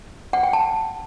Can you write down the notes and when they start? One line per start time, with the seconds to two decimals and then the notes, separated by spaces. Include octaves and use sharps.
0.33 F#5
0.43 G5
0.53 A5